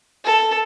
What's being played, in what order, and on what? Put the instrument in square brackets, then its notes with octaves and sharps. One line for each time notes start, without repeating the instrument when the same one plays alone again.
[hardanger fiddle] A4